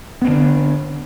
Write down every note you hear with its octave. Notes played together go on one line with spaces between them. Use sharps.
D3 B3 C4 D4